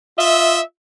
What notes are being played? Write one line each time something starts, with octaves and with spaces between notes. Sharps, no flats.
F4 D#5 E5